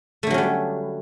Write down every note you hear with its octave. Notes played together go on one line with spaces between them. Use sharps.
D3 F#3 G3 A3 C#4